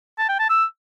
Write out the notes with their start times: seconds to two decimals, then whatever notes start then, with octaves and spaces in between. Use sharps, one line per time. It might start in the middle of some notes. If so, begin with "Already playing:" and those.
0.19 A5
0.29 G5
0.39 A5
0.49 E6